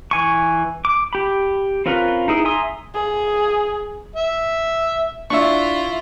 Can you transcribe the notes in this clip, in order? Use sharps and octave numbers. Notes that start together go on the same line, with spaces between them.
E3 G#5 C#6
D6
G4 B5
C4 C#4 F4 A#4 B4
D#4 E4 G#4
E5 G#5 A#5 C6 D#6
G#4
E5
D4 E4 F4 E5 C#6